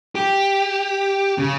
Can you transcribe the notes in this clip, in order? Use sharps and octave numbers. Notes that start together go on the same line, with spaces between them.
G4
C#3